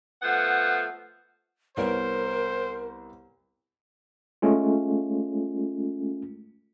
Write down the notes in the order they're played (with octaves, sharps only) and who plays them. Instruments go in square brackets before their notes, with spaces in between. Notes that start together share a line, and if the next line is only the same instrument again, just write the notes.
[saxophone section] F3 A3 B3 F#5
[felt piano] C2 B3 C#5 [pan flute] A#4 [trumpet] C5
[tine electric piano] G#3 A3 C#4 F4